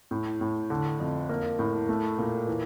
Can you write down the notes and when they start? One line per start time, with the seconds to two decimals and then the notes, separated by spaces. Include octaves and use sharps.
0.11 A2
0.41 A2
0.70 D3
1.00 F2
1.29 A#3
1.59 A2
1.89 A3
2.18 A#2
2.47 E3